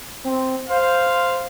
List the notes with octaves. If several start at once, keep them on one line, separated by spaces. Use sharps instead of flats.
C4
C5 F5